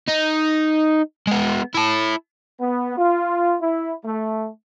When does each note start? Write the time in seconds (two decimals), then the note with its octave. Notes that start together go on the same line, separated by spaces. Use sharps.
0.08 D#4
1.27 G#3 B3
1.74 E4 A5
2.59 B3
2.97 F4
3.61 E4
4.04 A3